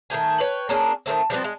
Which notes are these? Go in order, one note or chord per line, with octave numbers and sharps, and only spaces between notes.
D#3 A3 G5 G#5
B4 C#5 G5
A#3 C#4 D4 G#4
D#3 F3 A3 C4
F3 G3 B3 C4
G#3